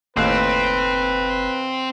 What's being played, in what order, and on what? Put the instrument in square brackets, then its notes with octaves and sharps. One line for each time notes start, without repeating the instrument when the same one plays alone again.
[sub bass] F#1 [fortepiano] D#2 A2 F#6 [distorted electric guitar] C4 [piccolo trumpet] B4